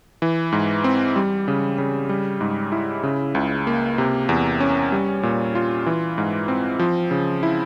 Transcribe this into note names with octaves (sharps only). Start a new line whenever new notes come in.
E3
G#2
C4
G3
C#3
C#3
G3
G#2
E4
C#3
C#2
A#3
C3
E2
C#4
G3
A#2
F4
E3
G#2
C4
F3
C#3
E4